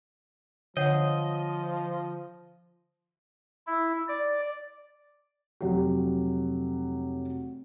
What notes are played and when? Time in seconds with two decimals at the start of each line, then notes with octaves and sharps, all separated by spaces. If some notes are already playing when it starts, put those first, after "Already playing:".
0.77 D3 F3 C#5 D#5 F#5
3.67 E4
4.08 D5
5.61 F1 F#3 G4